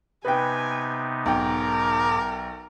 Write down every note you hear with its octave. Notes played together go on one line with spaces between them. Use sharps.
C3 B3 D#4 B4 G5 G#5
B1 G#2 A#4 G5 D6